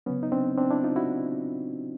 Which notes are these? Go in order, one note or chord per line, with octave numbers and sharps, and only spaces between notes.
C#3 F#3 B3 C#4
D#4
C4 D4
C4 D4
D4 E4
D#4 F4
E4 F#4